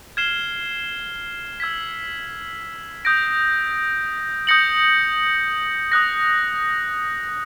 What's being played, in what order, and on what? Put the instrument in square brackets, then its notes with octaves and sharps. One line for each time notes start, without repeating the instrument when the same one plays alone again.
[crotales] F6 G#6 C7 E7 G7
E6 G#6 B6
D#6 G6 A#6 D7
D#6 G6 A#6 C#7 F#7
D#6 F#6 A#6